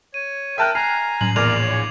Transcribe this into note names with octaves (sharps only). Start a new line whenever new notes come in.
C#5 D#7
A#4 E5 G5 A5 F#6
G#5 A#5 F6 C7
F#2 A2 F#7
A#1 E2 A#2 A#4 D5 D6 G#6 F7
C#5